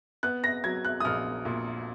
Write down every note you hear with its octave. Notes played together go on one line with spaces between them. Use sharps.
B3 F#6
A#6
F#3 G#6
F#6
D#6
A#1 F6
A#2